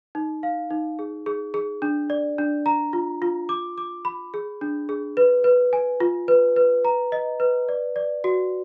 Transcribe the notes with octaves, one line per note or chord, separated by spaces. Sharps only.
D#4
F5
D#4
G#4
G#4
G#4
D4
D5
D4
A#5
F4
F4
D6
D6
B5
G#4
D4
G#4
B4
B4
G#5
F4
B4
B4
A#5
D#5
B4
D5
D5
F#4